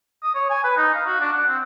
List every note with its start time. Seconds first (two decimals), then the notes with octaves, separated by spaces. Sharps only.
0.23 D#6
0.35 C#5
0.50 G#5
0.64 B4
0.77 D#4
0.95 F5
1.06 F#4
1.20 D4
1.33 F#5
1.49 C4